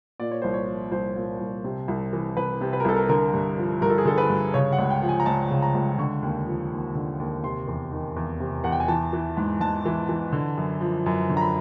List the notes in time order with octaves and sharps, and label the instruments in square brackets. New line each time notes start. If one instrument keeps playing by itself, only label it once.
[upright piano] A#2 D5
C#5
C2 C5
C#5
F3
C2 C5
A#2
C2
C3
C2
E3
C2 B4
C3
B4
A#4
C2 A4
A#4
D3 A#4
G2
F3
G2 A#4
A4
G#4
D3 A4
B4
G2
C#3 C#5
F#5
C#2
G5
F3
G#5
A#5
C#2 A5
C#3
A#5
C#2
D3 C#6
D#2
F3
D#2
D3
D#2
C3 C6
E2
D#3
E2
C3
E2 F#5
G5
G#5
E3 A5
E3
G#2
G#2 A5
E3
E3
D3
F#2
F3
F#2
D3
A#5
B5